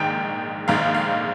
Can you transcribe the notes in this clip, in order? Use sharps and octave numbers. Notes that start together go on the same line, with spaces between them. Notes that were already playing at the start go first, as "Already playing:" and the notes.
Already playing: A#1 G#2 D#3 G5
A#1 G#2 D#3 F5
F5